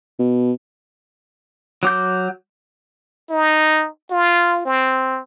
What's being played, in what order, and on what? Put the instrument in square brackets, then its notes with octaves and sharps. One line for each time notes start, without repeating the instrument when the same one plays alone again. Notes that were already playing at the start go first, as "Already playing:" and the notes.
[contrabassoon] B2
[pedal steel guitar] F#3 D6 G6
[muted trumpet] D#4
F4
C4